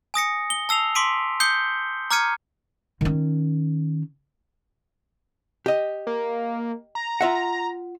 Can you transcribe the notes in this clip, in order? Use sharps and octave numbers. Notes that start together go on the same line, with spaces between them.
G#5 D#6 A#6 C#7
G7
A5 E6 C7 F7
C6 D6 B6 D7 D#7
D#6 G6 C7 C#7 G7
A#5 D6 F6 G#6 C#7 D#7
D#3 C#4
G4 D#5
A#3
A#5
F4 E5 F#5